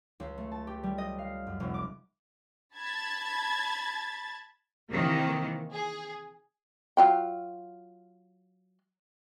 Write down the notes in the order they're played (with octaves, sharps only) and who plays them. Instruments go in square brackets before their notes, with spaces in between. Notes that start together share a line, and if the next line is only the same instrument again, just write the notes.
[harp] C#2
A3
A5
G4
G3
D#5
F5
F#2
F1
D6
[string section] A5 B5 G#6 A6
C3 D#3 E3 A#3
G#4
[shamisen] F#3 F4 G5